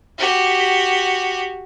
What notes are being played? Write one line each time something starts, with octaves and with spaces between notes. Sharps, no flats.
F#4 G4